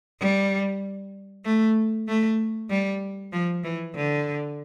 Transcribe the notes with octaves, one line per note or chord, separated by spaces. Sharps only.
G3
A3
A3
G3
F3
E3
D3